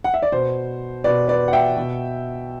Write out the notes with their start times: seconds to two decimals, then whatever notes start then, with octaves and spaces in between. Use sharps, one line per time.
0.04 F#5
0.14 E5
0.22 D5
0.32 B2 C5
1.04 B2 B4 D5
1.28 B4 D5
1.48 F#5
1.53 E5 G5
1.77 B2